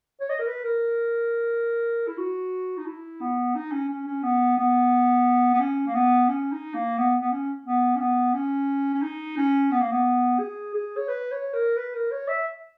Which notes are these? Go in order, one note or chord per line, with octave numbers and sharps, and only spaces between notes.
C#5
D#5
A#4
B4
A#4
E4
F#4
D#4
E4
B3
D#4
C#4
C#4
C#4
B3
B3
B3
C#4
A#3
B3
C#4
D#4
A#3
B3
B3
C#4
B3
C#4
B3
C#4
C#4
D#4
C#4
B3
A#3
B3
G#4
G#4
C#5
B4
C#5
A#4
B4
A#4
C#5
E5